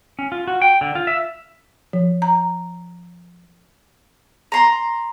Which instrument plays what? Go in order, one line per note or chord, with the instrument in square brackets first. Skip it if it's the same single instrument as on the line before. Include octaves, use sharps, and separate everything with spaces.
[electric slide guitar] C#4
F4
F#4
G5
D3
F4
E5
[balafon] F3
A#5
[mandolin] A#5 C6